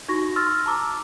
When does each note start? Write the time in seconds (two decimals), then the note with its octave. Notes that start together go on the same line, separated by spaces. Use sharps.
0.09 D#4 F#4 C#6 A#6
0.36 C6 E6 F6 A6
0.66 A5 A#5 D6 E6